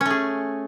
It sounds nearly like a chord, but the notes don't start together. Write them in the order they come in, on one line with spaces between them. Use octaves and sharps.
C#4 A3 G#4